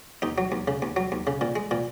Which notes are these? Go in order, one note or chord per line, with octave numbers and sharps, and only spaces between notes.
D#2 D#4
F#3
D#2
C#3
D#2
F#3
D#2
C#3
A#2
G#3
A#2